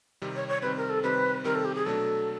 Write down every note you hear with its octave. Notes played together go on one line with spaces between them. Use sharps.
C3 D#3 G3 C4
C#5
C#5
C3 D#3 G3 C4 B4
A#4
A4
C3 D#3 G3 C4 B4
C3 D#3 G3 C4 A#4
A4
G4
G#4
B2 F#3 A3 D4 A4